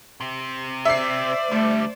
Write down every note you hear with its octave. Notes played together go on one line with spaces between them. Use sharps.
C3 C4
C5 D5 E5 C7
D3 G3 A3